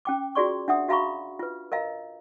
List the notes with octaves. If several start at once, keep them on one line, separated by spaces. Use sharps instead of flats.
C#4 G5 D6
F4 F#4 G#4 D5 C6 C#6
D4 E5 F#5 D#6
F#4 E5 F5 A#5 B5 C#6
F4 B4
A#4 D#5 F5 A#5